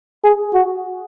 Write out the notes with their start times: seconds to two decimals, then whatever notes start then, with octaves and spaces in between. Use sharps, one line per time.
0.24 G#4
0.54 F#4